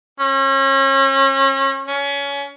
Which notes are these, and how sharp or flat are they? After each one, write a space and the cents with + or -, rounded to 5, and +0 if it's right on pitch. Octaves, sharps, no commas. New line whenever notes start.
C#4 -35
C#4 +25